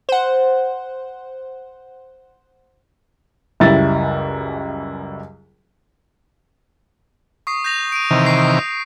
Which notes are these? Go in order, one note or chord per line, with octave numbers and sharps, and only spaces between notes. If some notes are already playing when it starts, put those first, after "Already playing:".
C5 F#5
C#2 F#2 G3 E4 A6
C#6 D#6 C7
G6 A#6 F7
D7 D#7
C3 D#3 E3
C#6 C7